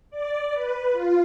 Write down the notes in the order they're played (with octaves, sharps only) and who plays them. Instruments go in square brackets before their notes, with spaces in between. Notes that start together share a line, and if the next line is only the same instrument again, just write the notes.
[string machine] D5
B4
F4